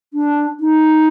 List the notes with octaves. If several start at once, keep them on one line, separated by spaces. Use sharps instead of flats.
D4
D#4